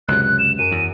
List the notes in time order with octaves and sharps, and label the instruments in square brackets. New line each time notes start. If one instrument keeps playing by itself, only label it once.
[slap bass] C#2 F#2 C3 [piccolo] F#6
[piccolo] F#6
E7
[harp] F#2 D7 [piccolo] D#7
[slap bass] E2